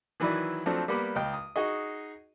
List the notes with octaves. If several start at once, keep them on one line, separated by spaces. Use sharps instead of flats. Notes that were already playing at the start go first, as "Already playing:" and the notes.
D#3 E3 F#3 E4 B4 D5
F3 F#3 A3 C4 D4
G3 A#3 B3 B5 D6
C#2 D#5 G5
D#6
D#4 F#4 G#4 D#5